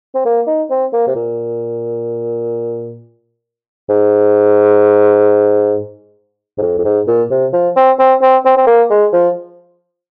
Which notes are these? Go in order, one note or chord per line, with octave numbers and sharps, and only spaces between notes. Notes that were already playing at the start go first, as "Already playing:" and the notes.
C4
A#3
D#4
C4
A#3
C3
A#2
G#2
G#2
F2
F2
G#2
A#2
C3
F3
C4
C4
C4
C4
C4
A#3
G#3
F3